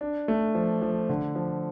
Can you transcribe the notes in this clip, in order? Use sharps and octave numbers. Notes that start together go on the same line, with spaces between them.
D4
A3
F3
F3
D3
F3